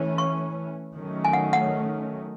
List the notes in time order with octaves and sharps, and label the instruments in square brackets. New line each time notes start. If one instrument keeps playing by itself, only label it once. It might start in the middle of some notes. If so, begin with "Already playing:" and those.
Already playing: [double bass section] E3 A3 C#4
[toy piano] C#6
[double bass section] D#3 F#3 A3 C#4
[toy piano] G#5
F#5
F#5